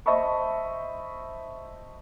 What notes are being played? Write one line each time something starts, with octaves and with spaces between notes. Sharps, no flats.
C5 D#5 E5 A5 B5 C#6